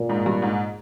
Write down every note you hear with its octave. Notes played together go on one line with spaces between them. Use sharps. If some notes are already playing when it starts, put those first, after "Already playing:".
Already playing: A#2
G#2
G2
G#2